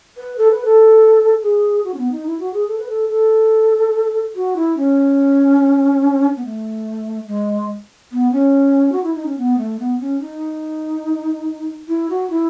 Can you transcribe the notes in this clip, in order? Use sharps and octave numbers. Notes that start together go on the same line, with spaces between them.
B4
A4
B4
A4
G#4
F#4
C#4
B3
D#4
E4
F#4
G#4
A4
B4
A4
A4
F#4
E4
C#4
B3
A3
G#3
B3
C#4
F#4
E4
D#4
C#4
B3
A3
B3
C#4
D#4
E4
F#4
E4